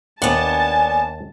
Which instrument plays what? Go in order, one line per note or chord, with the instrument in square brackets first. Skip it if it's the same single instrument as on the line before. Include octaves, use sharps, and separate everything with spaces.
[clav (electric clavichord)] D#2 F#5 [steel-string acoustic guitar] B3 D4 [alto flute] G#5 [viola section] A5